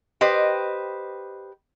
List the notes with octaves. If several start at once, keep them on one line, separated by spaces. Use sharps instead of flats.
G4 B4 C5 D#5